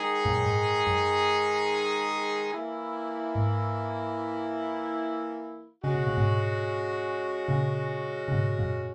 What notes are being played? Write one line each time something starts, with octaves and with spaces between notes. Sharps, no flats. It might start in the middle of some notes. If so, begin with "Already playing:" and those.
Already playing: D#3 G#3 D#4 G#4
F#2 A#2
F#2
G#2
F#2
E3 A#3 E4
G#2
C#3 G#3 C#4 F#4
B2
A#2
G#2 B2
A#2 C#3
C#3
G#2 B2
F#2 A#2